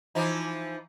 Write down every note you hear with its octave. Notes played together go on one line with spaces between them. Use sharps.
E3 F3 D#4